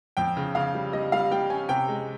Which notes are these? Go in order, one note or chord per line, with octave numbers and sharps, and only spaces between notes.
F2 G5
C#3
C#3 F5
G3
G3 D#5
G3 F5
G3 G5
C#4 G#5
C3 G5
G#3